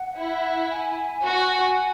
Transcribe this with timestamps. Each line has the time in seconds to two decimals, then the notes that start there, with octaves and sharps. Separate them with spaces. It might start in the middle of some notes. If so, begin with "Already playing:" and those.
Already playing: F#5
0.17 E4
0.72 G#5
1.25 F#4